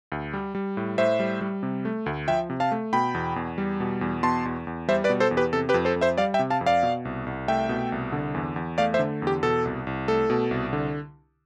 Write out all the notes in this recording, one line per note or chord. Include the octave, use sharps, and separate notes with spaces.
D2
G3
G3
A2
A2 C5 E5
G3
G3
C3
A3
D2
F3 E5 G5
C3
F5 A5
A3
B2 G5 B5
E2
E2
G3
B2
E2
B2 A5 C6
E2
E2
G3 C5 E5
B4 D5
B2
A4 C5
E2
G4 B4
C3 A4
G4 B4
F2
A4 C5
F2
C5 E5
G3 D5 F5
E5 G5
C3
F5 A5
F2
D5 F5
B2
C2
C2
A3 E5 G5
B2
C2
D3
E2
E2
A3 D5 F5
C5 E5
D3
E2
G4
B2 A4
C2
C2
A3 A4
B2
C2
D3